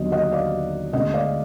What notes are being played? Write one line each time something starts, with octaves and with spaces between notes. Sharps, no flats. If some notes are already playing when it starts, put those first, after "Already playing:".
Already playing: D#2 D3 F#3 B3 D#5
D#5 F#5
D5 F5
D2 D3 G#3 B3 D#5 F#5
D5 F5